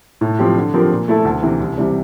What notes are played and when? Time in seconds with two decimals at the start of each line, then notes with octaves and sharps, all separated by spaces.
0.21 A2
0.39 F3 C4 G4
0.56 D3
0.74 F3 C4 G4 A#4
0.91 A#2
1.08 A3 E4 A4
1.25 D2
1.42 C3 E3
1.60 C2
1.78 C3 E3 G3